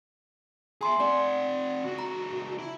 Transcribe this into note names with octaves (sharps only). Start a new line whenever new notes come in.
G#4 E5 G#5 A#5 C6
C4 D5 F#5
C#2 F#4
A#5
E4